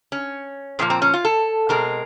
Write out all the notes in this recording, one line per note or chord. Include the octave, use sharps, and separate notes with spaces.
C#4
A#2 F3 A#3 C4
C4
C#4
F4
A4
B2 G#3 C4 A#4